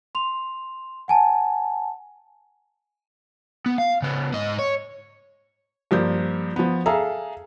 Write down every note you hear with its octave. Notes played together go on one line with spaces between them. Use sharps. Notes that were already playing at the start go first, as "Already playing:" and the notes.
C6 F7
F#5 G#5 A5
B3
F5
C#3 B3
G#2 D#5
C#5
G2 F3 A#3 G6
F3 B3
G#4 A4 E5 F5 A#5